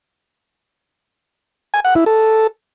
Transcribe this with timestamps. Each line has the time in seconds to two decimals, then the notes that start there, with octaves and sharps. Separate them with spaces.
1.74 G#5
1.85 F#5
1.95 E4
2.06 A4